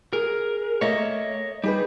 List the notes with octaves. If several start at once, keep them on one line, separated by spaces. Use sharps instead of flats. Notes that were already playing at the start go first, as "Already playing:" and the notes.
G#4 A#4
A3 A#3 C#5 D#5 E5
G3 D#4 G#4 B4